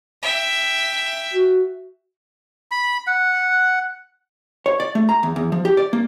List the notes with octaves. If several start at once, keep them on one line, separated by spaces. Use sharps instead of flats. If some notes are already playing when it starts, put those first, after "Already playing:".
E5 G5
F#4
B5
F#5
C#5
D5
A3
A#5
E2
E2
F3
G4
D5
A#3